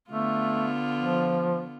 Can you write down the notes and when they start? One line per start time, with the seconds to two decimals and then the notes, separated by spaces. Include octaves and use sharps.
0.10 D3 A3 B3 F4
0.99 F3